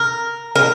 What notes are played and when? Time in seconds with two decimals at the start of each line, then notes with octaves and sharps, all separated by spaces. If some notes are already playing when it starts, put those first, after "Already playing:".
Already playing: A#4
0.55 A#4